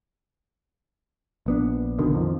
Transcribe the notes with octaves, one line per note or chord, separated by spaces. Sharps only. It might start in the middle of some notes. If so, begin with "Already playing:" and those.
A#1 B3 D4
A#1 B2 D3 D#3
F2 D#3 F3